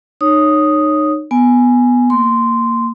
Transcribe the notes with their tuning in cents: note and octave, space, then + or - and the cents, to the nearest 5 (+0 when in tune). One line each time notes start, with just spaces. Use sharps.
D#4 -30 C#5 +0 D#6 +0
B3 +0 G#5 +0
A#3 -10 C6 -10